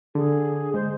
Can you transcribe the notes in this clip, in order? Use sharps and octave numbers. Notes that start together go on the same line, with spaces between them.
D3 G#4
G#3 C5